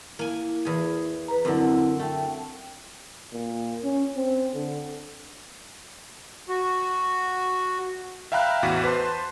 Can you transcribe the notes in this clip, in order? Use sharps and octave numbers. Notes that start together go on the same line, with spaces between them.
A#3 E4 G#5
E2 G#4
B4 A#5
F#2 D3 C4 E4 F#5
A3 E5 G5
A#2
C#4
C4
D3
F#4
E5 F5 G5 A#5 B5 F#6
A1 E2 F#4 D6 B6
B4 C5 A5 C6